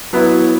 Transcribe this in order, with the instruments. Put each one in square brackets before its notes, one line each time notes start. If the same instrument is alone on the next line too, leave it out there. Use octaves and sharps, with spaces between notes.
[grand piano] F#3 B3 E4